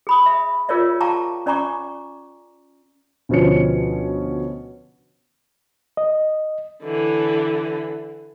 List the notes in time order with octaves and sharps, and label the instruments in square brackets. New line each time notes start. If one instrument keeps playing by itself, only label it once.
[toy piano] G#4 B5 D#6
E5
F4 G#4 A#4 C#5 D5 E5
F5 G5 A5 A#5 C#6 D6
C#4 D5 G#5 A#5 C#6 D6
[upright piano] D2 B2 F3 C#4 C#7
[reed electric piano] D#5
[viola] D3 E3